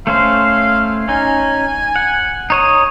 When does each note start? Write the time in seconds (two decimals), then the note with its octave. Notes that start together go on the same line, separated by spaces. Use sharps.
0.07 A3 C#4 C5 F5
1.09 C#4 D#4 G#5
1.96 F#5
2.50 D#4 C#5 D#6